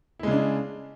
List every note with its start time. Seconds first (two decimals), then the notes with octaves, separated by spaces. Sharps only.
0.19 E4
0.23 G#3
0.27 C#3
0.31 D4